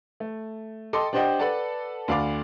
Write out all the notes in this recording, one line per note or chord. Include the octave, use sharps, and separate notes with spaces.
A3
A4 D#5 G5 C6 D6
D4 G4 C5 D#5 F#5 G5
A4 B4 D5 F#5 A5
D2 D4 F5 B5 D6